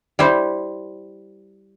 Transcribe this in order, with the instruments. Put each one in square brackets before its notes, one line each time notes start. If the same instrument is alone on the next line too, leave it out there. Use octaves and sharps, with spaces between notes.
[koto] G3 E4 C5